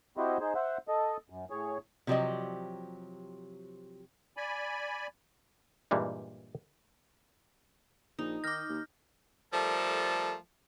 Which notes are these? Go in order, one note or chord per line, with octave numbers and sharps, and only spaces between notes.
C4 E4 F#4 G4 C5 D#5
D#4 G#4 C5
C5 E5 F#5
A4 D#5
F#2
A2 G#4 C#5
C3 F3 F#3 G4 D5 D#5
D5 G#5 B5
G2 A#2 E3 G3 G#3
A#1 D#4
D#3 D6 F6 G6 A#6
D#2
F3 G3 A3 A4 A#4